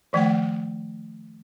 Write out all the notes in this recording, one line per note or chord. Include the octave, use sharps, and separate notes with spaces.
D#3 F3 A3 F#5 G5